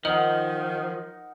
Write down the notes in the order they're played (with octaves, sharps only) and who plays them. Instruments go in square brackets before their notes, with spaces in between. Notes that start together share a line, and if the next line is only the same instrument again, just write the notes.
[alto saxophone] D#3 [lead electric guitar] F3 [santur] D#4 A#4 F#5 [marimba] D#5